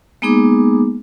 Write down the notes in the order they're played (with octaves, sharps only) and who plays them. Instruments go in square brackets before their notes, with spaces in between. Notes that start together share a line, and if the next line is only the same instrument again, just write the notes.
[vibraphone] G#3 A#3 B3 D#4 G#4 D6